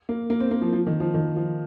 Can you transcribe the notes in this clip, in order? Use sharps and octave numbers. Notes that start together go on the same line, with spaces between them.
A#3
A#3
C4
A#3
F3
F3
D#3
F3
D#3
F3